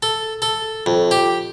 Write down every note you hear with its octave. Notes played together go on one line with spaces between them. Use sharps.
A4
A4
F2
G4